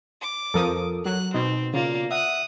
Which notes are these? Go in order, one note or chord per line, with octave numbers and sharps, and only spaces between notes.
D6
F2 F3 A4 A#4 D#6
F#3 F#6
B2 C4 D#4
C#3 A#3 F4 D5
E5 F#5 D#6 F#6